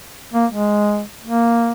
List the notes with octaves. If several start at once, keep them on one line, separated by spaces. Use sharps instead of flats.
A#3
G#3
A#3